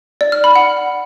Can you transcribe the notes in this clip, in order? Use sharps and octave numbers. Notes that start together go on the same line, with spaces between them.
D5
F6
B5
F#5